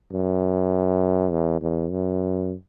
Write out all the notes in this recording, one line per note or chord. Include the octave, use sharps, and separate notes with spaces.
F#2
E2
E2
F#2